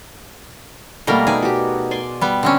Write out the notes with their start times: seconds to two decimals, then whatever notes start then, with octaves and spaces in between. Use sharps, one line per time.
1.07 B2 G3 A3 A#3 A#4
1.27 D#4 G#4 B4 D5
1.43 F#4 G4
1.91 D5 G#5 C6
2.21 G3 B3
2.43 D3 C4 C#4